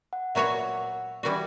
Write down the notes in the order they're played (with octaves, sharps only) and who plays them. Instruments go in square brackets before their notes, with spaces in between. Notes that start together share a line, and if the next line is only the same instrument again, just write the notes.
[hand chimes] F#5
[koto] A#2 F#3 B3 F#4 C#5 [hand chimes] E5
[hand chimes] F#5
E5
F#5
E5
[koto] E3 G3 B3 F#4 [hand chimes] D5